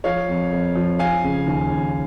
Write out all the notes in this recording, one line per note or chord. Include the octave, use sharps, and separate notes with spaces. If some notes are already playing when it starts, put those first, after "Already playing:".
F3 C#5 F5
F2
F2
F3
F3 F5 G#5
C#3
D#2
D#2